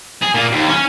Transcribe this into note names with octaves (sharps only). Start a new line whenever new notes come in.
G#4
A#2
D#2
C#4